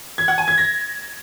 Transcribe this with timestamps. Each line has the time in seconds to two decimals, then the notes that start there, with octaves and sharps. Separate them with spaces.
0.18 G#6
0.28 F#5
0.38 G#5
0.48 G#6
0.58 A#6